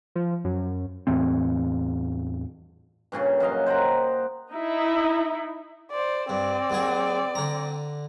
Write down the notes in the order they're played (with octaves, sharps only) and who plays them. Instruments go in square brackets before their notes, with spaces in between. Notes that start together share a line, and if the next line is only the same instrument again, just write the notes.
[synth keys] F3
F#2
[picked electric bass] E2 A2 E3 C4
[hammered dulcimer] G2 A#2 C#3 C#4
F#2 F#3 D#5 F5
C5 F#5 G5 A#5
[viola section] D#4 E4
[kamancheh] C5 D5
[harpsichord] G2 [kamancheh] C4 D5
[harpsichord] D#2 F#3 G#4
D3 A#5